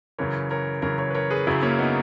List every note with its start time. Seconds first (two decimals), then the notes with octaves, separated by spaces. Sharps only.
0.18 F#2 C#3 E3 A#4 C#5
0.50 A#4 C#5
0.82 F#2 C#3 E3 A#4 C#5
0.98 A#4 C#5
1.10 B4
1.15 A#4 C#5
1.30 G#4 B4
1.47 F#2 C#3 F#3 E4 G#4
1.62 A#3 C#4
1.78 B3 D#4